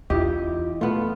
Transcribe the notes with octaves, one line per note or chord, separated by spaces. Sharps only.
E2 E4 F4 G4 D#5
A3 B3 F4